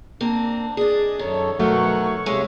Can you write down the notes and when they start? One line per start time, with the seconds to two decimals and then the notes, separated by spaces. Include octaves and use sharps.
0.21 A#3 C4 D4
0.77 D4 G#4 D5 D#5
1.19 F#2 D#3 A4 C#5
1.60 B2 F#3 A3 A#4 F#5 C#6
2.26 C3 G#3 C#5 E5 F5